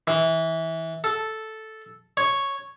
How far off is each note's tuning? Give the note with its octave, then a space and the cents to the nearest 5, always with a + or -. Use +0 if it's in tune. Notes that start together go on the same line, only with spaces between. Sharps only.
E3 -20
A4 -5
C#5 -5